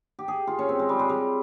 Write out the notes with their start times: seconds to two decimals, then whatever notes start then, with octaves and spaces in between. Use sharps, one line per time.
0.19 G4
0.28 G#4
0.47 F4
0.59 C#4
0.69 C4
0.79 G#3
0.89 G3
0.99 G#3
1.09 G3